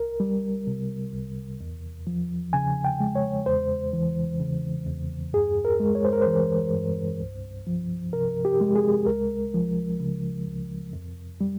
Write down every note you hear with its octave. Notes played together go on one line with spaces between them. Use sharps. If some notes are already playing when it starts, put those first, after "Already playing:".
Already playing: C2 A#4
G3
C3
C2
E2
F3
C#3 G#5
G5
G#3
C#5
E2 C5
E3
C#3
E2
G2 G#4
A#4
G#3
C#5
C5
A#4
E3 C5
G2
C2
F3
C3 A#4
G4
G#3
G#4
C#2 A#4
F3
C#3
C#2
F2
G3